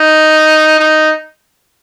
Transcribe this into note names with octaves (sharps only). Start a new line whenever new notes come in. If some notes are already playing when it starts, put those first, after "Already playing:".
Already playing: D#4
D#4